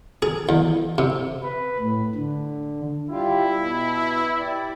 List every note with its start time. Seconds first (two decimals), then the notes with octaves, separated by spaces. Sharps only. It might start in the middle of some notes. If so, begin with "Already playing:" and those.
0.22 G#4
0.49 E2
0.98 C3
1.43 B4
1.80 A2
2.15 D3
3.10 G3 E4 F4 G4
3.57 B2
4.39 G4 D5